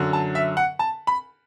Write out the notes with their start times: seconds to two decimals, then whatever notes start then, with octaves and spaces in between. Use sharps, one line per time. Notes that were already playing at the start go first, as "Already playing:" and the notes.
Already playing: F#2 D3 F#3
0.13 A5
0.35 E5
0.57 F#5
0.79 A5
1.07 B5